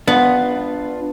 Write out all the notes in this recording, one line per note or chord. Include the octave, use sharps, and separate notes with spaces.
B3 D4 F4